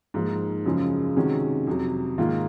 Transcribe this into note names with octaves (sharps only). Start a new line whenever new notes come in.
G#2 F3 A#3
F#2 C#3 F3 G#3
C3 D#3 G#3 C#4 F#4
F2 C3 F#3
G#2 D#3 A#3 F4